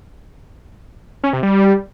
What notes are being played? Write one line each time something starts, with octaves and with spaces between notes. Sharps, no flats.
C#4
C3
G3